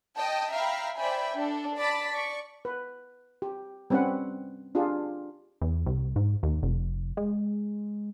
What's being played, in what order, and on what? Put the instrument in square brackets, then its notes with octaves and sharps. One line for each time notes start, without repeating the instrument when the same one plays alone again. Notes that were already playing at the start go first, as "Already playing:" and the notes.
[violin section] D#5 G5 A5
E5 F5 G5 A#5 B5
C5 D5 E5 G5 G#5 B5
D4 A4
D5 A5 B5 D6 A6 B6
D5 C#6 D6
[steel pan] B4
G4
G3 C4 C#4 B4 F#5
D4 F4 G4 G#4
[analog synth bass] E2
C2
G#2
D#2
F1
G#3